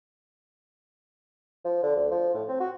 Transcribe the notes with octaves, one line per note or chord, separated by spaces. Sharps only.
F3
D3
D2
F3
A2
C4
F#4